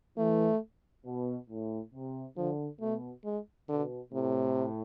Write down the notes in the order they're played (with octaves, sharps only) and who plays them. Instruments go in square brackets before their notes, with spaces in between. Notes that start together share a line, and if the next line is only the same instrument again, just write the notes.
[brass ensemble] E3 [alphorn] A3
[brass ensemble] B2
A2
C3
[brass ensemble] D3 [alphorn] F3
[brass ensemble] B2 [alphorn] A3
[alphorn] G#3
[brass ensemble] B2 [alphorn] D3
[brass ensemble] A2 [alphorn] C3